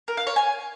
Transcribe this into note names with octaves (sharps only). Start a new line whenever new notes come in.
A#4
F5
C#5
G#5